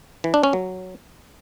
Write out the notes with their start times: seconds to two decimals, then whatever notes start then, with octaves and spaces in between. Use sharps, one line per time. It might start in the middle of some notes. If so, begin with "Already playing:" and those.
0.24 E3
0.34 D4
0.43 C#4
0.53 F#3